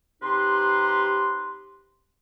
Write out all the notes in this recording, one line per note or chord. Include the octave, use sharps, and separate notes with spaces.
C3 D#4 G4 B4 C6